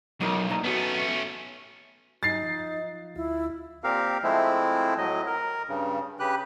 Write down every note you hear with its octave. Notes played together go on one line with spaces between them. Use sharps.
B1 F#3 D#4 A#4
A#2 D#4 A#5
A3 B3 C#4 F#4
G2 F#3 D#4 A6 C7
F3
D2 E4 F4
A#2 C4 G4 A#4 F5
F3 G#3 A3 C4 E4
A2 F#3 D#5
A#4
G2 C#3
C#3 G4 B4 F#6